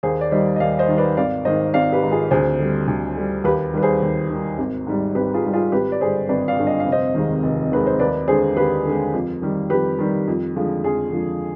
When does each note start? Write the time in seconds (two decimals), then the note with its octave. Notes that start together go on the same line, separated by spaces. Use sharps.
0.03 D#2 G#4 C5
0.21 D5
0.31 D#3 G3 C5 D#5
0.56 D#5
0.60 D#2 D5 F5
0.79 C5 D#5
0.89 D#3 G3
0.98 B4 D5
1.17 G#1 D5 F5
1.45 G#2 D#3 C5 D#5
1.74 G#1 D5 F5
1.92 G4 B4
2.03 G#2 D#3
2.11 F4 G#4
2.31 D2 G#4 C5
2.59 D3 G3
2.88 D2
3.16 D3 G3
3.44 D#2 G4 B4
3.73 D#3 G3 B4
3.82 G#4 C5
4.02 D#2
4.30 D#3 G3
4.58 G#1
4.87 G#2 G3
5.15 G#1 G4 B4
5.34 F4 G#4
5.44 G#2 G3
5.53 F4 G#4
5.72 G#1 G4 B4
5.92 D5
6.01 G2 D3 G3 G#4 C5
6.29 G#1 B4 D5
6.48 D5 F5
6.57 G2 D3 G3
6.67 D#5
6.80 F5
6.86 F1
6.92 C5 D#5
7.15 D#2 D#3 G#3
7.43 F1
7.71 D#2 D#3 G#3 B4
7.87 C5
7.99 D#2 B4 D5
8.28 D3 G#3 G#4 C5
8.57 D#2 G4 B4
8.85 D3 G#3
9.13 F2
9.42 D#3 G3
9.70 F2 G4 B4
9.99 D#3 G3
10.28 F2
10.56 D3 F3 G#3
10.84 F2 F4 G#4
11.12 D3 F3 G#3